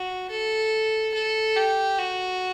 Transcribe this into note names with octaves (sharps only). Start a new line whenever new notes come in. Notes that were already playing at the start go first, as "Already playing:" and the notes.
Already playing: F#4
A4
A4
G4
F#4